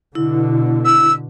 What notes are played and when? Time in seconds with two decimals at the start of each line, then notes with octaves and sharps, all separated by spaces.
0.15 B2 D3 E4
0.85 E6